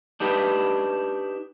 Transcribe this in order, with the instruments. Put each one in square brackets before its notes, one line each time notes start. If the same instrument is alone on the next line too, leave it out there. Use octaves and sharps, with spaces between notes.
[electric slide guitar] D4 D#4 G4 B4